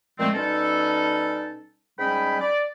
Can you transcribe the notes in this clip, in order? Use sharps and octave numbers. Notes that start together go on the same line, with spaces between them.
A#2 F3 G#3 A3 C4
B2 G3 C#4 D#4 A4
G#2 G3 C#4 D#5 G5 B5
D5